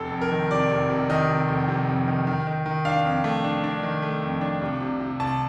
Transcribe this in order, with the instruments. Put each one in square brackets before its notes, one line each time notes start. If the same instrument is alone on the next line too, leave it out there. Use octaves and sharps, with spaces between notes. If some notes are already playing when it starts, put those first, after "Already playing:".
Already playing: [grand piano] F1 A4
F2
A#4
D#3
C3 D5
F1
C3
D#3 D#5
C3
F1
C3
F2
D#3
D#3
D#3
D#3
D4 F5
F2
A3
D4
D4
D#3
A3
F2
D4
C2
C3
C3
C2 A5